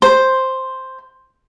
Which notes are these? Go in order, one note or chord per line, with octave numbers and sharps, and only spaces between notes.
C5